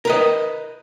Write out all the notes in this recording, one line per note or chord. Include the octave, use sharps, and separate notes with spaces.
A#4 B4 D#5